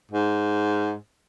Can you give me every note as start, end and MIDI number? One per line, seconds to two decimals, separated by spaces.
0.12 0.95 44